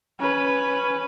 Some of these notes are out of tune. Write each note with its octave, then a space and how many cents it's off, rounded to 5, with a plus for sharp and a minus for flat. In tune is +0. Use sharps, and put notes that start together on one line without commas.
C#4 +0 B4 +0